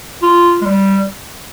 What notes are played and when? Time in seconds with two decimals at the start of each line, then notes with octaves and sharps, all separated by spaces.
0.22 F4
0.61 G#3
0.66 G3